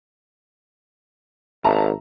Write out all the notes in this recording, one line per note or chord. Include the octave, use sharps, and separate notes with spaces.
G#1 E5 A5 A#5